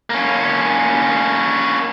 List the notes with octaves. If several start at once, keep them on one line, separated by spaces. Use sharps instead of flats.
A#3 C#4